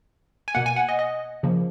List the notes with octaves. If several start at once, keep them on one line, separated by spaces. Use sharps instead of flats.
G#5
B2 A#3 F#5
G#5
F#5
D#5
D#5
C#3 F3 A#3